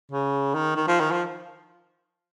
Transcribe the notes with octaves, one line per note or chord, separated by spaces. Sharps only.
C#3
D#3
D#3
F3
D#3
F3